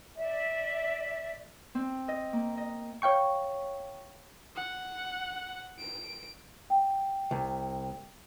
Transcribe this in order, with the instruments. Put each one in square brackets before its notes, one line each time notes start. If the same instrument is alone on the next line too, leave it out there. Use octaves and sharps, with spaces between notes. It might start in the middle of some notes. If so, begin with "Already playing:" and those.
[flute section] D5 E5
[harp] C4
D#5
A#3
D#5
[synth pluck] C#5 F5 G5 C#6
[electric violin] F#5
D7
[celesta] G5
[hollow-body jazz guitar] C2